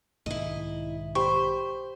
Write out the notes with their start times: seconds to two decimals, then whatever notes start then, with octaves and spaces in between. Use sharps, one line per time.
0.26 B1 G#2 D#3 E4 D#5
1.15 G4 C5 B5 C#6